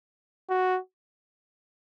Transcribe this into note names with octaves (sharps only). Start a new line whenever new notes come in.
F#4